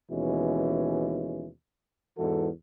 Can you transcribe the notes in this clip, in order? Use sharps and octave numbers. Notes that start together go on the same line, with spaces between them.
D#2 B2 E3 G#3 C#4
E2 G#2 E3 F#4 A4